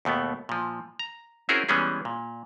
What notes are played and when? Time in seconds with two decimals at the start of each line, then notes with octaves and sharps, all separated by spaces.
0.05 D#2 B2 A3 B3
0.49 A#2 F3
0.99 A#5
1.49 C4 C#4 E4 F#4 G#4 A#4
1.69 E3 G3 G#3 B3 C#4 G#4
2.05 A#2